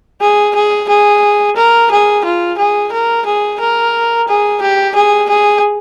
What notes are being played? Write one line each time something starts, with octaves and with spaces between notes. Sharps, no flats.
G#4
G#4
G#4
A#4
G#4
F4
G#4
A#4
G#4
A#4
G#4
G4
G#4
G#4